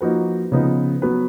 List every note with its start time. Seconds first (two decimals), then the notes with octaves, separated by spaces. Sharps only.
0.01 F3 A#3 D#4 F#4 B4
0.52 C#3 F3 B3 D#4
1.02 F#3 B3 F#4 B4